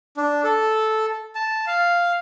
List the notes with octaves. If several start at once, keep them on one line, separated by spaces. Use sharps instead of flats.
D4
A4
A5
F5